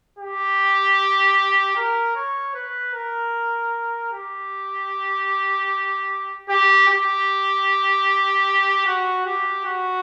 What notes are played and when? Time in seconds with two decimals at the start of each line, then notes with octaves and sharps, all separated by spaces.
0.19 G4
1.76 A#4
2.16 C#5
2.55 B4
2.94 A#4
4.12 G4
6.49 G4
6.88 G4
8.86 F#4
9.26 G4
9.65 F#4